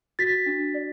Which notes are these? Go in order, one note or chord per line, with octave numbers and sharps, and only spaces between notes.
F#4 A6 B6
D4
D5